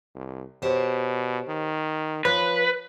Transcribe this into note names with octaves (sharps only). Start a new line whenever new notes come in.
C2
B2 G4 C5 C#5
D#3
F3 B4 C#5 F5